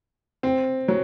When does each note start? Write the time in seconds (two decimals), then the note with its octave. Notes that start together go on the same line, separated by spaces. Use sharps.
0.43 C4
0.88 F#3